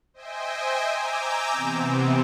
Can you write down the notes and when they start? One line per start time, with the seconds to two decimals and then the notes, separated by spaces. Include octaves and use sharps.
0.14 C5 D#5 E5 G5 G#5
0.88 G#5 A#5 D6 E6 G6
1.52 C3 E3 B3 C4